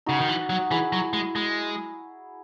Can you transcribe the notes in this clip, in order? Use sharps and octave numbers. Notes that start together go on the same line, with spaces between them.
C#3 D#4 F#4
D#3
E3
F#3
E3 E4 G#4
F#3
G#3
G#3